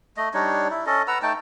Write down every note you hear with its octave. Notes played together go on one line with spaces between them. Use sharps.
A3 D#5
G3 D4 D#4 C#5
E4
C#4 A4 D#5
B4 F#5 A#5 E6
A3 D#4 G5 A5